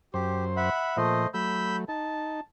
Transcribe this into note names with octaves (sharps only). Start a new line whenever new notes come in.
F#2 G4 C5
E5 F#5 B5
A#2 F3 A3 C5 D#5
F#3 A3 B5 E6 G6
D#4 A5